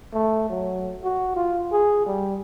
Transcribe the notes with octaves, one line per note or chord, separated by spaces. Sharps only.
A3
F#3
F#4
F4
G#4
G3